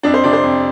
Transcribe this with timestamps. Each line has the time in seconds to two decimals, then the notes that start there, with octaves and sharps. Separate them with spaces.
0.03 F2 D4 D5
0.14 C5
0.24 C3 D4 D5
0.33 C5
0.43 F2